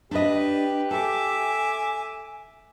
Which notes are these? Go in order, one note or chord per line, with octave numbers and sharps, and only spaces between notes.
D4 G4 B4 D#5
A4 E5 G#5 D6